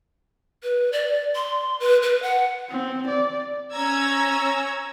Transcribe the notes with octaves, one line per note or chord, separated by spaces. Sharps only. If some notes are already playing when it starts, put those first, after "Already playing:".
B4
D5
C6
B4
B4
F#5
C4
D5
C#4 A#5 E6 G#6